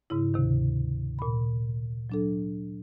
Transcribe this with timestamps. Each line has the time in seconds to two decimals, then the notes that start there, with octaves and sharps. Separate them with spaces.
0.10 G#2 C#3 E4
0.34 D2 C3 D#3
1.19 A#2 B5
2.10 F#3 D4 A4